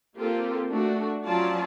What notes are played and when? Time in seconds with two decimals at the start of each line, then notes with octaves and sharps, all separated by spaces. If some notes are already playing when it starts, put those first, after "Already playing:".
0.17 A#3 C4 F4 G4 A4
0.70 A3 D4 F#4
1.24 F3 F#3 C#4 F4 D5 A5